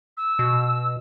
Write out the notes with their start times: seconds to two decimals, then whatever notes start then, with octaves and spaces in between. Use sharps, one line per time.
0.17 E6
0.39 B2